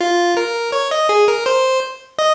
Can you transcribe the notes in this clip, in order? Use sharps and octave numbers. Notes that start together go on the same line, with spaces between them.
F4
A#4
C#5
D#5
G#4
A#4
C5
D#5